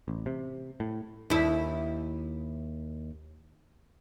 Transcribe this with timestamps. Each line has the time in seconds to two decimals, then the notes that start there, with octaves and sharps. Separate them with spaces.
0.08 A1
0.26 C3
0.80 A2
1.30 D#2 E4